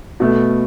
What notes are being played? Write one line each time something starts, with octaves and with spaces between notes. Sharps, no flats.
B2 A3